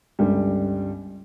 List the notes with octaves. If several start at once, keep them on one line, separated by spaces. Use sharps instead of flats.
G1 C#2 G3